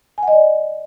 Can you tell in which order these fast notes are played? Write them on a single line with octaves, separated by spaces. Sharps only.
G#5 F#5 D#5 D5